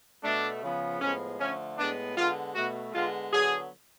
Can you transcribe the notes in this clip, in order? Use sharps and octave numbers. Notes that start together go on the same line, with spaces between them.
B2 A3 D4
C#3 F3 B3
A2 F3 G#3 B3 C#4
D3 F3 A3 C#4
A2 G#3 B3 D4
D3 G#3 B3 F4
B2 A3 F#4
D3 G#3 B3 F4
D3 F#3 B3 G#4